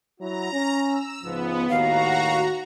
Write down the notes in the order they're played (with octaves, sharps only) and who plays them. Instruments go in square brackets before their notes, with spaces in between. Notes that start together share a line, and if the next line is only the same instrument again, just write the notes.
[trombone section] F#3 E4 F#4 [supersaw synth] A#5
[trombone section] C#4
[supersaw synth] E6
[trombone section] C#2 G#2 F3 [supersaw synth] B3
[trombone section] D#2 A2 D#3 [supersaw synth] F#4 A#5 [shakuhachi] F5